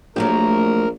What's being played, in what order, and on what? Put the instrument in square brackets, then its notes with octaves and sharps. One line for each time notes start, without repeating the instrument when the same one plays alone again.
[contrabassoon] A#1 [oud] F#3 A3 G4 [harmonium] A#4